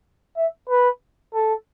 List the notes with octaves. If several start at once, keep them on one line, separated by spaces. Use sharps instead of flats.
E5
B4
A4